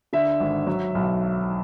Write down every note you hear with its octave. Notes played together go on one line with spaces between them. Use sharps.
D3 E5
G#1
F#3
B1